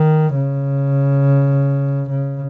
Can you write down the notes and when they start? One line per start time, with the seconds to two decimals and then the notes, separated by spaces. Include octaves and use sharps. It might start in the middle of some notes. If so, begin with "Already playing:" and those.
Already playing: D#3
0.35 C#3
2.10 C#3